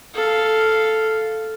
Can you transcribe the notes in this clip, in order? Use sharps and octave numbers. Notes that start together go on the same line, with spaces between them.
A4 F5